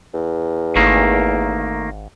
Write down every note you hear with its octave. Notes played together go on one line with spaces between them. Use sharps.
E2
G#1 D#3 A3 A#3